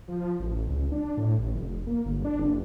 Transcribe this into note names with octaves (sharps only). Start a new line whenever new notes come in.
F3
A1
C#2
D4
A2
A1
F1
A#3
G1
D4
F#1